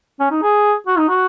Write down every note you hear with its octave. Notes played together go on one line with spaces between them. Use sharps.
C#4
D#4
G#4
F#4
D#4
F#4